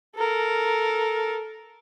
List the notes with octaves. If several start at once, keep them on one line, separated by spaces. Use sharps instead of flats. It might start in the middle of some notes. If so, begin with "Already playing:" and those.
A4 A#4